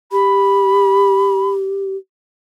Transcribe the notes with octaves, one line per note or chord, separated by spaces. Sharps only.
G4 B5